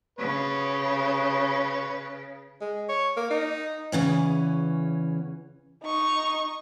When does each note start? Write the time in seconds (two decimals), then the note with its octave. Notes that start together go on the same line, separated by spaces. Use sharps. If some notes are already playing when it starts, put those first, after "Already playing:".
0.19 C#3 B4 C#5
2.61 G#3
2.89 C#5
3.17 A#3
3.30 D#4
3.92 E2 C#3 E3 C#4
5.83 D#4 C#6